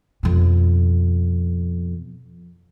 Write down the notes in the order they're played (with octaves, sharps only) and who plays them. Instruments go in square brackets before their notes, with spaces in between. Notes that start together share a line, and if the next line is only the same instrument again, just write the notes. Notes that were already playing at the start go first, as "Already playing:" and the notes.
[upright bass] F2 B2